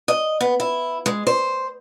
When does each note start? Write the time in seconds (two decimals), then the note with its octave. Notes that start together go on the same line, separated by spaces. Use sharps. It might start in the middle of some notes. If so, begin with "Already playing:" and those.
0.08 D#5
0.40 B3
0.60 E4
1.06 G#3
1.27 C5